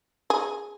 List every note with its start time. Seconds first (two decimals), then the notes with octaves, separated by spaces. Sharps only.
0.30 G#4